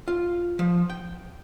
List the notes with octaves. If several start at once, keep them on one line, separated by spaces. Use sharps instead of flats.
F4
F3
G5